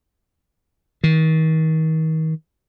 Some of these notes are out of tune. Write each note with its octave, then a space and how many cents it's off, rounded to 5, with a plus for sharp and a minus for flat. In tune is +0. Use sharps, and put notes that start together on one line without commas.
D#3 +35